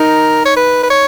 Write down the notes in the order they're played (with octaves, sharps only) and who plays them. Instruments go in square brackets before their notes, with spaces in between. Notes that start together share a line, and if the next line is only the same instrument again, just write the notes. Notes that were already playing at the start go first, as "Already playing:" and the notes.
Already playing: [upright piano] D#4 [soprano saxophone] A#4
[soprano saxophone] C#5
B4
B4
C#5